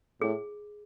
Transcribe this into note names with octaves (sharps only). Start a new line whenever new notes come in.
A2 G#4